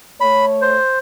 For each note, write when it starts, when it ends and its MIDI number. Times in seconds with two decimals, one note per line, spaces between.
0.21 0.78 57
0.21 0.78 73
0.21 0.45 83
0.61 0.99 72